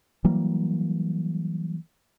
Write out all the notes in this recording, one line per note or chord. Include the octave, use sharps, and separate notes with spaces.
E3 F#3 G3 A#3